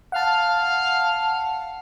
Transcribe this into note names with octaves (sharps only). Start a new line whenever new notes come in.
F5 F#5 A5